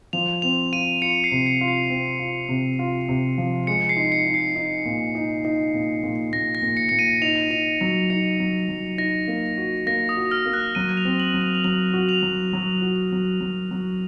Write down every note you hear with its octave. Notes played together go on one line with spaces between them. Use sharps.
F3 F7
C4 F7
F4 D#7
F4 C#7
C7
C3
C#7
F4
C7
C4
F4
C3
F4
C3
F3
G#3 C#7
C7
D#4
C#7
D#4
C7
D#4
A#2
D#4
D#4
A#2
A#2
A#2 A#6
A#6
A#2
C#7
A#2 C#7
D#7
D#4 F7
D#4 F7
F#3 D#7
D#4 C#7
F#3
F#3
D#4 A#6
A#3
F#4
A#3 A#6
D#6
F#4
F6
A#3
F#6
F#3 D#7
F7
C4
F#7
F#3
F7
F7
F#3 F#7
F#4
F7
F#3
F#3
F#4
F#3
F#3
F#3